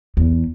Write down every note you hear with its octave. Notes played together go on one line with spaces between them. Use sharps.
E2